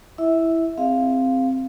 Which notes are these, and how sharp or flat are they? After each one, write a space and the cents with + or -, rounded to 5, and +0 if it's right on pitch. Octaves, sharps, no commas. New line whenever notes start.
E4 +0 E5 -20
C4 +0 G#4 -30 F5 +0